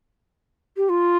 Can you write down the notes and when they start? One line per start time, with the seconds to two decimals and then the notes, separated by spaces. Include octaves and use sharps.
0.77 G4
0.89 F4